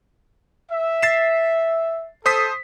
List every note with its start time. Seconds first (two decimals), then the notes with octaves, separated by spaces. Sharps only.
0.72 E5
1.02 A6 C7 E7
2.26 A4 C5 D#6 B6